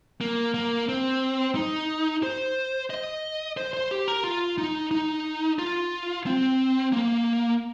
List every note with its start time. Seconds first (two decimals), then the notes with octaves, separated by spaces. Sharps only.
0.21 A#3
0.54 A#3
0.89 C4
1.55 D#4
2.23 C5
2.90 D#5
3.57 C5
3.73 C5
3.91 G4
4.08 A#4
4.24 F4
4.58 D#4
4.91 D#4
5.59 F4
6.26 C4
6.92 A#3